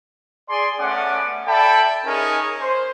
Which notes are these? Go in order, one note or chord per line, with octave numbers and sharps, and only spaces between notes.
G#4 D5 G#5 C6
A3 B3 C#4 D5 F#5 D6
A4 D5 E5 G5 A5 B5
C#4 D#4 G#4 A#4
C5